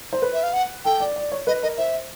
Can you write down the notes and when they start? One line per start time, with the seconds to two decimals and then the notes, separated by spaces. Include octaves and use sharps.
0.13 C5
0.22 B4
0.33 E5
0.43 F5
0.53 F#5
0.85 A4 G5
1.00 D5
1.16 D5
1.32 C#5
1.47 B4 D#5
1.63 A#4 D#5
1.78 C5 E5